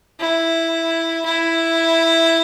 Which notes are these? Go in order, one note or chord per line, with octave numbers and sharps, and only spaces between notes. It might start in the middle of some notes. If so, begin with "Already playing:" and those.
E4
E4